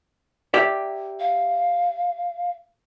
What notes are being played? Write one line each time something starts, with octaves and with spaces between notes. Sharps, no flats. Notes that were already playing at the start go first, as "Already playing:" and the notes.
G4 D5 E5
F5